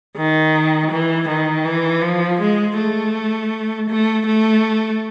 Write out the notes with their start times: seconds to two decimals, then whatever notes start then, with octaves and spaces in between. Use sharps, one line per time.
0.17 D#3
0.91 E3
1.29 D#3
1.65 E3
2.02 F3
2.40 G#3
2.78 A3
3.89 A3
4.26 A3